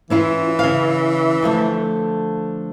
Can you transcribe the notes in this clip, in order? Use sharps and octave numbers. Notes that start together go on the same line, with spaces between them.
E3 C#4 E4 F4
C#3 F5
D3 F3 A3